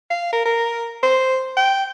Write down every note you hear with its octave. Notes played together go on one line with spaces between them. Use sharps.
F5
A#4
A#4
C5
G5